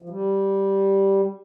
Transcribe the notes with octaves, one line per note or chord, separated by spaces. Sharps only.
F3
G3